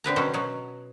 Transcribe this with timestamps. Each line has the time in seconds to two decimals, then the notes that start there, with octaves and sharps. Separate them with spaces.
0.04 D3 C4 B4 A#5
0.16 B2 F#3 C#4 A4 C5
0.34 B2 F#3